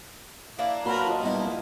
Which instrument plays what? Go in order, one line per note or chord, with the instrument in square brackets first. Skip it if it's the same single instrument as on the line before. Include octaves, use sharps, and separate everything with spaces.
[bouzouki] A#3 D4 [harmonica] E4
[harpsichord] A#2 C6 [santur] F#3 A5 [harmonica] A#4 B4 B5
[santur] F4 D#5
[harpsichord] G2 B2 D#4 [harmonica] E4
[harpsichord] A#1